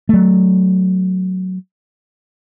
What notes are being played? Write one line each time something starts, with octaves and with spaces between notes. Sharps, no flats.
F#3 A3